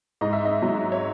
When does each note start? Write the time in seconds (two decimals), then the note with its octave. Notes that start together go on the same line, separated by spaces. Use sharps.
0.21 G#2 D#5
0.33 E5
0.45 D#5
0.62 F#3
0.92 C#5